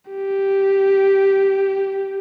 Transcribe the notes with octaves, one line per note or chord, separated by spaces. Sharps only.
G4